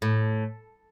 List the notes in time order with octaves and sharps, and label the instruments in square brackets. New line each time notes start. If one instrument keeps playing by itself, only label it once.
[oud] A2